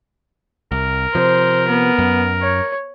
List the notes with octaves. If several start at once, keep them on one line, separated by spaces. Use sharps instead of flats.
C2 A#4
C3 F3 C5
B3
F#2
C#5